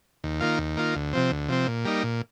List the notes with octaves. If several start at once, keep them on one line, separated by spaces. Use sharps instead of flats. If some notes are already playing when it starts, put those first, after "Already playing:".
D#2
D#3 A#3 F4
D#2
D#3 A#3 F4
D2
C3 F3 C4
D2
C3 F3 C4
A#2
G3 A#3 D#4
A#2